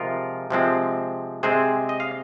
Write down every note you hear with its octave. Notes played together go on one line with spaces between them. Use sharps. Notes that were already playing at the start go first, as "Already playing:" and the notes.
Already playing: C3 F3 G#3 F4 A#4
C3 F3 G#3 C4
C3 G#3 C4 G#4 C5
D#5
F5